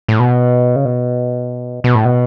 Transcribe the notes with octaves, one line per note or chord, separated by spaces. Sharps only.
A2
B2
C#3
B2
B2
A2
B2